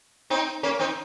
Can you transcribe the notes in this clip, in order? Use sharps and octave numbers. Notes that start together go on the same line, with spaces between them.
C4 D#4
A#3 C#4
C4 D#4